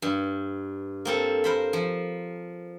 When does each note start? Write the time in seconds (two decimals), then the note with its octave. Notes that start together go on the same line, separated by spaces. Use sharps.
0.02 G2
1.05 A#3 C4 A4
1.44 A#4 C5 B5
1.73 F3